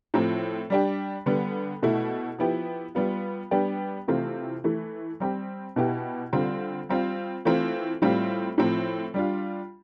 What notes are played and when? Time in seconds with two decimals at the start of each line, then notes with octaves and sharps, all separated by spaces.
0.14 A2 F3 C4
0.70 G3 D4 G4
1.26 D3 G3 B3
1.83 B2 A3 E4
2.38 F3 B3 E4 G4
2.95 G3 B3 F4
3.51 G3 B3 D4 G4
4.08 C3 E3 A3 C4 F4
4.64 E3 A3 E4
5.20 G3 C4 G4
5.76 B2 B3 E4 G4
6.33 D3 G3 C4 F4
6.89 G3 C4 F4
7.45 E3 A3 C4 F4
8.02 A2 G3 C4 F4
8.58 A2 F3 C4
9.14 G3 D4 F4